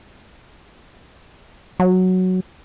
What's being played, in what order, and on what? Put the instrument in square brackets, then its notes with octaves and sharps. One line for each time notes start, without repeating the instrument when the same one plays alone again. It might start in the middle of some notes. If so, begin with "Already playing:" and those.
[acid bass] F#3